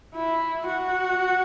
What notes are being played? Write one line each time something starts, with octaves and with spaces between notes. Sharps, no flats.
E4
F#4